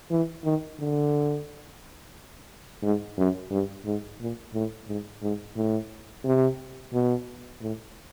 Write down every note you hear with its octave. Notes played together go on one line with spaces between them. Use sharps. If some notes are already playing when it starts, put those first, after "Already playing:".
E3
D#3
D3
G#2
F#2
G2
G#2
A#2
A2
G#2
G#2
A2
C3
B2
A2